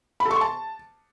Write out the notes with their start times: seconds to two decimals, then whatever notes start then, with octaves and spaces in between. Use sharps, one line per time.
0.20 B5
0.25 A4
0.31 C#6
0.36 C6
0.41 A5